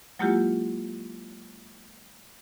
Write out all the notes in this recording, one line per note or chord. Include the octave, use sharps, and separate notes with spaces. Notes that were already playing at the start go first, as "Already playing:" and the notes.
F#3 G#3 A#3 E4 F4 G4